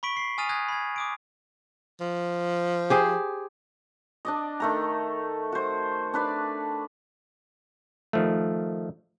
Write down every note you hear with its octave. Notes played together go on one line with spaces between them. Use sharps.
B5 C#6 B6 D7 F#7
B6 C7
G#5 D#6 F6 A6 D#7 F7
D#6 F#6 G#6 A#6 D#7
B5 G#6
D6 D#6 D7
F3
G4 G#4 C5
D4 D5 D#5
D#3 A3 A#5
F#4 C5
D4 B4 D5
D#3 F3 A3